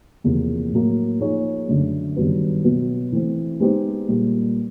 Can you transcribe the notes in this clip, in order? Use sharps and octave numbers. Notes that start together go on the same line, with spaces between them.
E2 C3 F3 A#3
A2 F#3 A#3
F3 A#3 D#4 G#4 C#5
F#2 D3 F#3 A3
G2 D#3 F#3 B3
B2 F#3 B3
E3 A3 C4
G#3 B3 D#4 G4 C5
A#2 G3 A#3